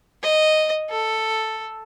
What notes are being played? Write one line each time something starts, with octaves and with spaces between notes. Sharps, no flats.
D#5
A4